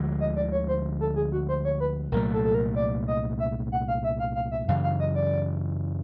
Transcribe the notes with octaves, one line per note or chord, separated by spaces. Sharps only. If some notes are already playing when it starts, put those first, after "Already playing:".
Already playing: D2 D3 F3 G#3
D#5
D5
C#5
C5
A4
G#4
F#4
C5
C#5
B4
C2 A#2 F#3 A3 A#4
A4
A4
A#4
D5
D#5
E5
F#5
F5
E5
F5
F5
E5
F#2 C#3 E3 F5
F5
D#5
D5